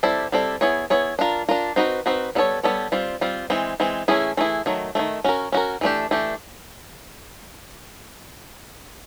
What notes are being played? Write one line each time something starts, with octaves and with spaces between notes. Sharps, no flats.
G3 C4 E4 A4 D5
G3 C4 E4 A4 D5
B3 E4 G#4 C#5
B3 E4 G#4 C#5
D4 F4 A#4
D4 F4 A#4
C4 D#4 F#4 B4
C4 D#4 F#4 B4
G3 B3 E4 A4 C#5
G3 B3 E4 A4 C#5
G3 C4 F4
G3 C4 F4
E3 G#3 C4
E3 G#3 C4
E3 A3 C#4 E4 G#4
E3 A3 C#4 E4 G#4
D#3 F#3 A3
D#3 F#3 A3
C#4 F#4 A#4
C#4 F#4 A#4
E3 A3 D4 G4
E3 A3 D4 G4